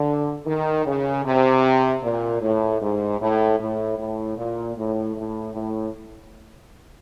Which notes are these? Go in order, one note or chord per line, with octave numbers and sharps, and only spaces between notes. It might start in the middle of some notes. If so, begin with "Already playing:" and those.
Already playing: D3
D#3
C#3
C3
A#2
A2
G#2
A2
A2
A2
A#2
A2
A2
A2